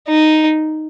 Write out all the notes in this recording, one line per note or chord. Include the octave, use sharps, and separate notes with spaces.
D#4